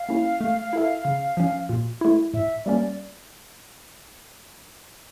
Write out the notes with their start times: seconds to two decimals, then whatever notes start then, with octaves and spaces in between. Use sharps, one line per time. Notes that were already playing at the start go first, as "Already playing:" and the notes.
Already playing: F5
0.09 A#3 C#4 E4
0.41 A3
0.73 E4 A4 E5
1.05 C#3
1.37 F3 C#4
1.69 A#2
2.01 A3 E4
2.34 A2 E5
2.65 G3 A#3 C#4 D5